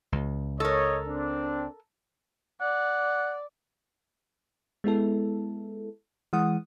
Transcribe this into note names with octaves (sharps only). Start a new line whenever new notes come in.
C#2
A4 A#4 C#5 D#5
C4 D4
D5 F#5
G#3 B3 E4 A4
E3 G#3 F#5 D#6